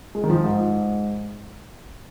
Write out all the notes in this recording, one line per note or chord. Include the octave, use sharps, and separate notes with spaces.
G#3
D#3
F3
G#2